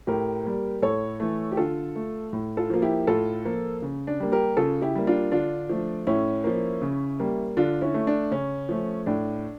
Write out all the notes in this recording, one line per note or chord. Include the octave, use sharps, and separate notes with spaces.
A2 G4 A#4
G3 A#3
A2 A4 C#5
E3 A3
G4
D3 F4 A4
A3
A2
F4 A4
F3 A#3 F4
E4 G4
A2 F4 A4
F3 A#3
C#3
D4
G3 A#3
G4 A#4
C#3 F4 A4
E4 G4
G3 A#3
D4 F4
D3 D4 F4
F3 A3
A2 C#4 E4
F3 A#3
C#3
G3 A#3
D3 D4 F4
C#4 E4
A3
D4
C#3 C#4
F3 A3
A2 D4